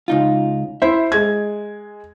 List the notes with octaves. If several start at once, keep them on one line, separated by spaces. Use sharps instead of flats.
C#2 D#4 F4
E4 C5 E5
G#3 G#6